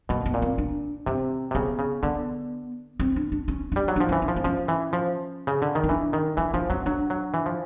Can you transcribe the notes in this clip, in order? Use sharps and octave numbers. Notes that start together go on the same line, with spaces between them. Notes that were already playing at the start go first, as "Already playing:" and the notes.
B2 A#3
B3
A#2
C4
D4
C3 C4
C3
C#3 B3
C#3
D3 B3
C4
D4
D4
C#4
G3 D4
F#3
F3 D4
E3 C#4
D4
F3
C4
F3 C#4
E3
F3
C#3
D3
D#3
D#4
E3 D4
D#3
E3 D4
F3 D4
F#3 C#4
F#3 D4
F#3
E3
F3